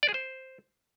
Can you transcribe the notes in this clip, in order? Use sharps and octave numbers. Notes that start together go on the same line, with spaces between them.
D5
G#4
C5